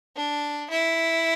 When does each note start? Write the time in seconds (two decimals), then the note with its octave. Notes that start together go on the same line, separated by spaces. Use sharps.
0.16 D4
0.70 E4